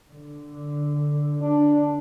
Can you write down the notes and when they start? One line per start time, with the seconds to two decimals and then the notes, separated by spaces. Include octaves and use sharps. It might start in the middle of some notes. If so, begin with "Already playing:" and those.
0.12 D3
1.41 D4